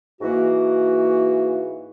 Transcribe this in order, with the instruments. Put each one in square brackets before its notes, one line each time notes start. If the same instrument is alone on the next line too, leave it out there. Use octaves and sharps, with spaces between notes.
[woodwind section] G#2 E3 A#3 F#4